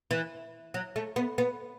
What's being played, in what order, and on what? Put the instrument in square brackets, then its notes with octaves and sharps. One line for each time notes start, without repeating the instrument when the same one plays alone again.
[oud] E3
F#3
A3
B3
B3